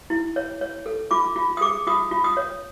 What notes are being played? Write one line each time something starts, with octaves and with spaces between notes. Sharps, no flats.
E4
C#5
C#5
A4
F4 D6
F4
D#6
G#4 D6
F4 D#6
F4
D#6
C#5